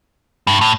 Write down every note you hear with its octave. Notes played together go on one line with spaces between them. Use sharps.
G2
A2